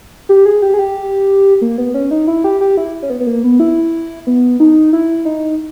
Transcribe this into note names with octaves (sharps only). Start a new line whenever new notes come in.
G4
G#4
G4
G#4
G4
A#3
B3
C#4
D#4
E4
G4
G4
E4
C#4
B3
B3
A#3
B3
E4
B3
D#4
E4
D#4